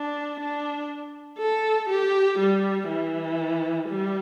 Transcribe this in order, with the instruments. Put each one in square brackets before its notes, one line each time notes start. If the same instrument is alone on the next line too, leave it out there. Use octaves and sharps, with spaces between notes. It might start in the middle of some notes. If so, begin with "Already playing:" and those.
Already playing: [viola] D4
D4
A4
G4
G3
E3
G3